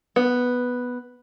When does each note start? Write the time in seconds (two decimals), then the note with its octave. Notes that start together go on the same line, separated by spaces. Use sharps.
0.16 B3